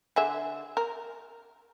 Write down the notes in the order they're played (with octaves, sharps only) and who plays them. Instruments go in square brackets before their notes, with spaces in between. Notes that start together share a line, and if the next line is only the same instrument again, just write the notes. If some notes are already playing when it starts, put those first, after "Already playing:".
[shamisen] D3 G#4 E5
A#4